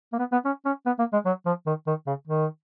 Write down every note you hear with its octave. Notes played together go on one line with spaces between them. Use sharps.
A#3
B3
B3
C#4
C#4
B3
A#3
G#3
F#3
F3
D#3
D#3
C#3
D#3